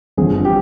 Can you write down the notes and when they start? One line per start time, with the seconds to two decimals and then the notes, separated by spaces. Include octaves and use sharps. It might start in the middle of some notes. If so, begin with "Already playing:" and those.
0.17 G1 F2 D3 G#4
0.45 G4